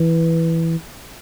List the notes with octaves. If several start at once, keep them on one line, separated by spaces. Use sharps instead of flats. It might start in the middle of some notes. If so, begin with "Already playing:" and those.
Already playing: E3